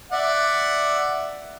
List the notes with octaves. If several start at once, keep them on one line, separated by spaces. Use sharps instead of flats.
D5 E5 F#5